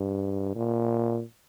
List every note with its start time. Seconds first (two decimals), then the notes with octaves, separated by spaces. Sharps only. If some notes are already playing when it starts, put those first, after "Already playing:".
Already playing: G2
0.55 A#2